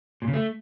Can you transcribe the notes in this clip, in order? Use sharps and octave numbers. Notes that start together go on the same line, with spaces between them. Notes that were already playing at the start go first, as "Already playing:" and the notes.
A#2
C#3
A3